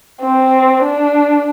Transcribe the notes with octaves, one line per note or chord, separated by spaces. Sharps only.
C4
D4